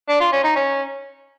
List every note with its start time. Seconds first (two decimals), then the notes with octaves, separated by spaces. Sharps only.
0.09 D4
0.20 F4
0.32 C#4
0.44 D#4
0.56 C#4